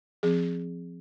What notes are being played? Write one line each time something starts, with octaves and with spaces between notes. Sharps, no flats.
F3 C4 G#4